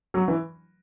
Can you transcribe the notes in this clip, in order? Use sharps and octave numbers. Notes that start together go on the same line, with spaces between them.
F#3
E3